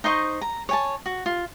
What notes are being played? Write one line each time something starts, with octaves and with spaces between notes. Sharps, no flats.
D#4 C5 D#5 C#6
A#5
C#5 G#5 A5
F#4
F4